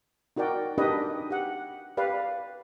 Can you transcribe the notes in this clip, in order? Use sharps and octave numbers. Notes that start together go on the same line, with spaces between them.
D#4 F#4 A#4 D5 G5
D4 D#4 G4 A#4 B4 D#5
G4 F#5
G4 B4 D5 F5